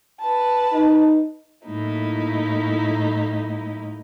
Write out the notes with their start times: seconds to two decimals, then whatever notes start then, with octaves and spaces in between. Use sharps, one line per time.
0.20 B4 A5
0.72 D#4
1.66 A2 F#3 A#3 D#4 E4